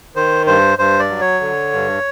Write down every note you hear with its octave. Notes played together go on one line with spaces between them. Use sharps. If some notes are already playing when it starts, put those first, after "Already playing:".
D#3 C5
G2 C5
G2 C5
D5
F#3
C#5
D3
G2